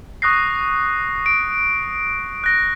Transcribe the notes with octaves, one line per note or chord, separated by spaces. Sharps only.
C#6 D#6 F#6 A#6 C7
D7
F#6 A#6